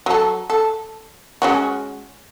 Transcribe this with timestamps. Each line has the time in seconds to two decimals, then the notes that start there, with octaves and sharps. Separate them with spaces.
0.06 F#3 A4
0.50 A4
1.42 G#3 C#4 F#4